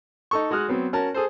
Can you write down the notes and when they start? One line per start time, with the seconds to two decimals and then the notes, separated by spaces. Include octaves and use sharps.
0.31 D#4 A4 C#6
0.51 G#3 F#4 D#6 F6 F#6
0.69 F#3 B3 C4
0.93 C#4 F#4 A#4 A5
1.14 G#4 A4 C5